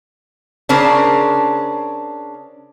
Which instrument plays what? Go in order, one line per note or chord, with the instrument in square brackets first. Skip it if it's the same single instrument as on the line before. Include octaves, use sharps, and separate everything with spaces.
[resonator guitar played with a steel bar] C#3 D4 A#4 C5